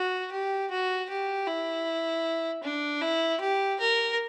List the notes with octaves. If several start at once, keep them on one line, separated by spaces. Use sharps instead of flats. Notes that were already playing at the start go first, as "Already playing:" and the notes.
Already playing: F#4
G4
F#4
G4
E4
D4
E4
G4
A#4